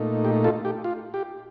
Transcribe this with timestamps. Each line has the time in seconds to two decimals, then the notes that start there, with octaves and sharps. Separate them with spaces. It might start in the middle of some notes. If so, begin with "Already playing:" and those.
Already playing: A#2 A3 D#4
0.25 G4
0.44 F4 A4
0.65 G4
0.84 F4
1.14 G4